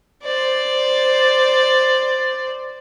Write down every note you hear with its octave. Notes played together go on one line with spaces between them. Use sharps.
C5 D5